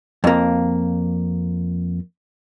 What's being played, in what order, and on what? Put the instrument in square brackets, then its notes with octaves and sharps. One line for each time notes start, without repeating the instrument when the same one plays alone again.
[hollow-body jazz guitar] F2 A#3